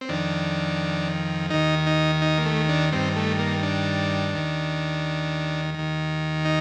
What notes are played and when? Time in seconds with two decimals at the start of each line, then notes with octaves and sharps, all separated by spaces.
0.01 C4
0.09 F2 D#3 D4
1.50 D#2 D#3 D#4
1.87 D#4
2.22 D#4
2.38 A#3
2.45 A3
2.69 D4
2.92 G2 D#3 C4
3.16 A3
3.39 A#3
3.63 D4
4.33 D#2 D#3
5.74 D#2 D#3
6.45 D#4